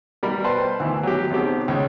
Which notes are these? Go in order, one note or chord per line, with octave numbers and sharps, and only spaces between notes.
B2 G3 A#4 B5
B4 C5 G5 A5 C6
D2 E3
F#3 G4
B1 C4 G4 G#4
C#2 C#5